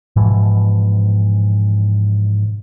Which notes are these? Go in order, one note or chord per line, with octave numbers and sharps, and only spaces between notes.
G#2 B2 E3 F3